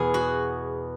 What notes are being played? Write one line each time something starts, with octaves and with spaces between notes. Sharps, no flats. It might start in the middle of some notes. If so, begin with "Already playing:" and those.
Already playing: E2 B2 G#4
F#4